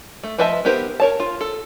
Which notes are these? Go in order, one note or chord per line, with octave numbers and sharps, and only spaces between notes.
A3
F3 B4 D#5 E5 A5
B3 D#4 G4 A#4 C5
A#4 C#5 A5
F4
A4